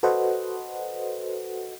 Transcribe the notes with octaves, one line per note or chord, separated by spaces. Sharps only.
F#4 A4 B4 C5 D#5 F#5